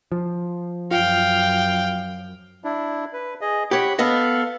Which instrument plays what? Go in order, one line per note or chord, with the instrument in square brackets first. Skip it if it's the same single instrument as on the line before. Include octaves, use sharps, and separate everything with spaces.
[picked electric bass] F3
[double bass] F#2 [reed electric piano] F4 [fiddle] F5 G5
[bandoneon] D4 E4
B4
G#4 D#5
[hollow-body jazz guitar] G4 C#5 [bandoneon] F#5 B5
[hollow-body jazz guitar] B3 D#5 [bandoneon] A4 F5